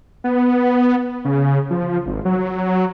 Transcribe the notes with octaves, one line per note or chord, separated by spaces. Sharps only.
B3
C#3
F3
G#1
F#3